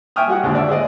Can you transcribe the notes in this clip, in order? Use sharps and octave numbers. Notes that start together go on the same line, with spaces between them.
E5 G5 G#5 C#6 D#6 F6
G3 F#4 F#5
D#2 G#2 D3
D5 E5 E6
G#4 C5 D5 D#5